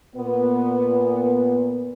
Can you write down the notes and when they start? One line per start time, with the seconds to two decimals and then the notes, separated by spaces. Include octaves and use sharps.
0.16 A#2 B3